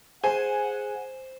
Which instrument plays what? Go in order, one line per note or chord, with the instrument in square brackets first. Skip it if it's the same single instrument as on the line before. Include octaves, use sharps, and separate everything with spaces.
[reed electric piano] G#4 [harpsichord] C5 [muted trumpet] F#5 [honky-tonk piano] G#5